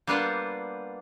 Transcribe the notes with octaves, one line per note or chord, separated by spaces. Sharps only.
G3 A#3 B3 D4 F4 C5